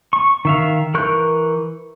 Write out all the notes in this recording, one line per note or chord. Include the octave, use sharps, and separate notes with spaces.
C#6
D#3 E5 F5
E3 A#4 C#6 F#6 G6